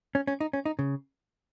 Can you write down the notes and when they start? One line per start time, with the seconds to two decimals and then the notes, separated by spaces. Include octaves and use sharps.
0.15 C#4
0.27 C#4
0.41 D#4
0.53 C#4
0.66 D#4
0.79 C#3